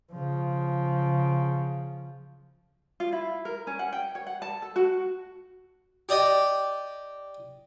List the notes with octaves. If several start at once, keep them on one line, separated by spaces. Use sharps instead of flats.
C#3 F3
F4
E4
A#4
C#4
F#5
G5
C#5
F#5
A5
A4
F#4
G4 D5 D#5 G5